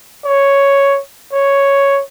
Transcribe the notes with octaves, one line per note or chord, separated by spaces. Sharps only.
C#5
C#5